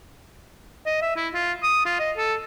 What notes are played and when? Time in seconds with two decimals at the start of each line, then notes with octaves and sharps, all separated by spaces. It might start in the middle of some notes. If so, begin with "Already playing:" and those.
0.86 D#5
1.02 E5
1.16 E4
1.34 F4
1.63 D#6
1.86 F4
2.00 D#5
2.17 A4